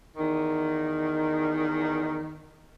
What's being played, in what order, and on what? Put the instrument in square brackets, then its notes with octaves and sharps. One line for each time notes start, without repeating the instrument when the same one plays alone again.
[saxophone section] E2 D#3